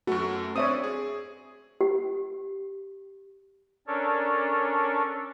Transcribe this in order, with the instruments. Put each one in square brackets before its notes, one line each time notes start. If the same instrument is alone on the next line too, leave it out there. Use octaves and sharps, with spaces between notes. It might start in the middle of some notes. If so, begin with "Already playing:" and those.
[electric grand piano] F#2 A3 [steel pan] F#4
[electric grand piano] C4 D4 D5 [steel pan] C#5 E5 D#6
[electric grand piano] G#4
[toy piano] G4
[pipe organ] C#4 D4 A4 A#4 C#5 D5